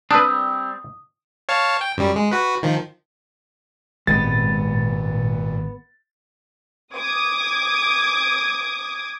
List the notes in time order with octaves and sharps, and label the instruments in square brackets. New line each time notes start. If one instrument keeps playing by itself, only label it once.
[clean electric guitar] G3 C4 [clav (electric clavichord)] D4 B4 [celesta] D#6
[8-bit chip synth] C#5 F5 A5
G5
F#2 G3
G#3
F#4 B4
D#3 F3
[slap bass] G#1 G2 [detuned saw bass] A#2 [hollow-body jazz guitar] G#3 B3 C4 [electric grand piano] A6
[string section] D6 D#6 G#6